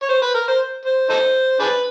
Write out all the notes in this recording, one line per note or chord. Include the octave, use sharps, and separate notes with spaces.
C#5
C5
B4
A#4
C5
C5
D#4 A4 C5
D4 G#4 B4